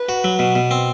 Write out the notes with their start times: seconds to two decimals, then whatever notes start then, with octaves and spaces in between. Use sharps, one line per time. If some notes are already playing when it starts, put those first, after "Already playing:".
Already playing: B4
0.09 F#4
0.24 F#3
0.39 B2
0.55 B2
0.71 C4